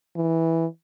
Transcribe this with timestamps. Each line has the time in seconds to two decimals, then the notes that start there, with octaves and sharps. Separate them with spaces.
0.16 E3